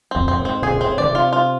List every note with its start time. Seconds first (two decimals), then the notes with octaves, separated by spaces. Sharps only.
0.11 F2 C4
0.28 A2 C4
0.40 G#2
0.45 C4
0.62 G#2 G#4
0.70 A2
0.78 G#2
0.81 C4
0.86 A2
0.98 D3 D5
1.09 C3
1.15 F4
1.33 F4